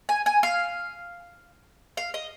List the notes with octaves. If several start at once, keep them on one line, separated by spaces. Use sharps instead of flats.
G#5
G#5
F5
F5
D#5